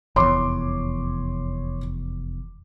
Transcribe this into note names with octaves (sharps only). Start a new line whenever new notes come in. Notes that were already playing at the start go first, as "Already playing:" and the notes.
F1 E2 C#5 C6 D6